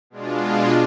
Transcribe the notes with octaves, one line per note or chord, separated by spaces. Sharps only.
B2 G#3 D4 F4